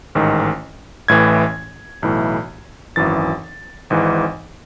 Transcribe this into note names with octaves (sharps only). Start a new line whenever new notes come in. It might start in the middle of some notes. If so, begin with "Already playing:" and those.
A1 G#2 D#3
A1 A2 E3 G#6
B1 A2 E3
G#1 F#2 E3 A6
G#1 G#2 E3